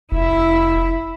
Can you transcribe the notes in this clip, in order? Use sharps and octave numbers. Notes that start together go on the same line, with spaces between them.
F1 E4 E5